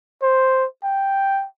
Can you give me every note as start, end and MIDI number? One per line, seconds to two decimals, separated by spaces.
0.22 0.66 72
0.83 1.46 79